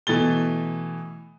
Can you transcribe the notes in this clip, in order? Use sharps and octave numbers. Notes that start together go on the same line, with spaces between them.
B2 E3 A3 A6 G7